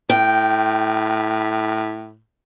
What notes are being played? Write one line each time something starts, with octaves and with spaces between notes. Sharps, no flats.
A2 G5